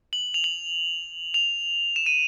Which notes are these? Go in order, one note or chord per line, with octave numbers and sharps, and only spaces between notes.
F#7
F7
F#7
F7
E7
D#7